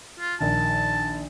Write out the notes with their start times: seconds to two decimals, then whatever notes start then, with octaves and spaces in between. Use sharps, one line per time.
0.20 F4
0.40 A#1 D#3 A5